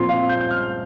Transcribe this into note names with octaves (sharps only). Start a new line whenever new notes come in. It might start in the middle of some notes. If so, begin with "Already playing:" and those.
Already playing: A#2 F3 C4 C6
F5
G6
G6
F6